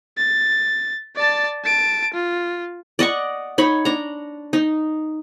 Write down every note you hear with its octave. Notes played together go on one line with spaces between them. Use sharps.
A6
D5 A5
A5 D7
F4
D5 D#5 F#5 C#6
D#4 C#5 B5
D4 A#5
D#4